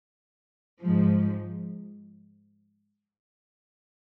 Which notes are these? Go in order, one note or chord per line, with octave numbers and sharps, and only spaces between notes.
G#2 F3